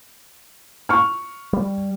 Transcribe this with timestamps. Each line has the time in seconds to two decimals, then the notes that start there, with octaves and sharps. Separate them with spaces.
0.89 C#6 F6
1.53 G3